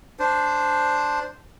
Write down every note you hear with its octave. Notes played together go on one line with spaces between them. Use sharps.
D4 C5